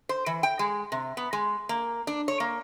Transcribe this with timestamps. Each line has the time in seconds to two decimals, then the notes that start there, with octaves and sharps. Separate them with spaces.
0.09 C5
0.26 E3
0.43 G5
0.59 G#3
0.92 C3
1.17 B3
1.33 G#3
1.69 A#3
2.07 D4
2.28 C#5
2.40 A#3